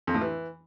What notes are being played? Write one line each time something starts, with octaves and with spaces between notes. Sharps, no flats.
F2
A2
E3